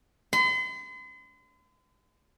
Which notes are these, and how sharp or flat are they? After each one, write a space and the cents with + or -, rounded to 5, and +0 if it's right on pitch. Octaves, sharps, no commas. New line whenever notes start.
C6 -45